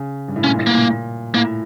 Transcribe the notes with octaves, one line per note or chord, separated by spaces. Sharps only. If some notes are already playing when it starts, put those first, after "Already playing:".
Already playing: C#3
G2
A2
A#2 C#4
A2
A#3
A#2
A2 A#3